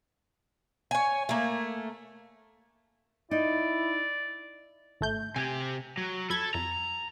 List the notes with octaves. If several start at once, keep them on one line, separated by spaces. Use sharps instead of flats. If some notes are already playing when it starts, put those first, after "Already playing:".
C#5 G#5
A3 A#3
D#4 E4 D5
G#1 A3 G6
C3 G4 G#5
F#3
F#2 A4 B5 G#6
F2 A#5